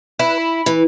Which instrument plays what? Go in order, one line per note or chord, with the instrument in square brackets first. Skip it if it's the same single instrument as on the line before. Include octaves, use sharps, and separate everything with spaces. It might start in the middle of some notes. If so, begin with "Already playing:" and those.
[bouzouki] E4 [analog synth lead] B4
[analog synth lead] B5
[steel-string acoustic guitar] E3